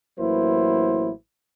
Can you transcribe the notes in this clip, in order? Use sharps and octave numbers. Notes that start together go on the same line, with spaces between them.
A1 F#3 A#3 E4 B4 C5